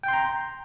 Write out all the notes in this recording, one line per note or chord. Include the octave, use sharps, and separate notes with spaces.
G5 A#5 C6